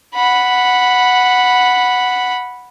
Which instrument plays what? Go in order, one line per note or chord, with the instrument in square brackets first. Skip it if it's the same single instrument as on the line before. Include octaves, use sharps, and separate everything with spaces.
[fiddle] F#5 B5